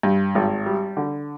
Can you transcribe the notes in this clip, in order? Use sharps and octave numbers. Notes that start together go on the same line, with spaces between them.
G2
G#1
G3
D3